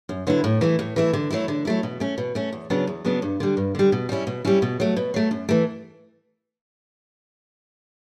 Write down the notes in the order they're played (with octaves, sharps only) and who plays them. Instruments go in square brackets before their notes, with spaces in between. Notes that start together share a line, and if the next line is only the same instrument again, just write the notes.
[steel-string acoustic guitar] F#2
D3 F#3 B3 E4
A2
E3 A3 E4
A2
E3 A3 E4
D3
F#3 A3 E4
D3
F#3 A3 E4
B2
A3 C#4
B2
A3 C#4
E2
C#3 F#3 B3 D4
E2
C#3 F#3 B3 D4
G2
D3 G3
G2
D3 G3
B2
G3 C#4 E4
B2
G3 C#4 E4
B2
F#3 A3
B2
F#3 A3
F#2
E3 A3